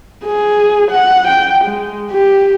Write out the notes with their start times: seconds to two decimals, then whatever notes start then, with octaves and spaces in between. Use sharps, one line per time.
0.25 G#4
0.92 F#5
1.28 G5
1.65 G#3
2.11 G4